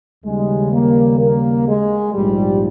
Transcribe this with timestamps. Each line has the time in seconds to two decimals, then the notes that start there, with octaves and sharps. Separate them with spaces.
0.24 D#2 C#3 G3 G#3
0.72 A#3
1.19 A#3
1.67 G#3
2.14 A#1 G#2 F3 G3